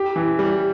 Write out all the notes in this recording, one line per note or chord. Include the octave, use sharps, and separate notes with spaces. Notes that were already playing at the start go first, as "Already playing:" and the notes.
Already playing: G4
E3
G3